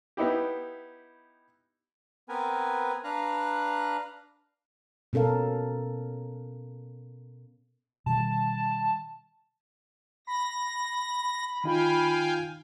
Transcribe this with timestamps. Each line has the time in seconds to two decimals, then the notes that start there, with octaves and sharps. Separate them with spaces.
0.17 B3 D#4 E4 G4
2.29 B3 C4 A#4 B4 G#5
3.04 D4 B4 F5 A#5 F#6
5.13 B2 C#4 A4 A#4 F5
8.06 B2 D#3 G3 A5
10.27 B5 A#6
11.64 D#3 D#4 F4 F5 G5 G#5